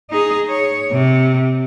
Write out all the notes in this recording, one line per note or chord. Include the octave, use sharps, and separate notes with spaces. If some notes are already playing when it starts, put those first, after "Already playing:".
D#4 G#4
C#5
C3